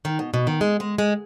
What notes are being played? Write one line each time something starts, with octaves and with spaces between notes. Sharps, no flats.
D#3
B2
B2
D#3
G#3
G#3
G#3